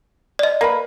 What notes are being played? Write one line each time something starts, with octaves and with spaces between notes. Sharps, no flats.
D5 D#5
A#3 B4 B5